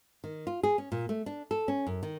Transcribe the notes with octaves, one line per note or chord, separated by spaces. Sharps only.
D#3
F4
G#4
C#4
A#2
A3
D4
A4
C#4
F#2
D#3